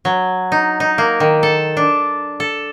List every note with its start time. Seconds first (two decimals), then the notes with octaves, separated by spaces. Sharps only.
0.05 F#3
0.52 D#4
0.80 D#4
0.98 A#3
1.20 D#3
1.43 A4
1.77 D4
2.40 A4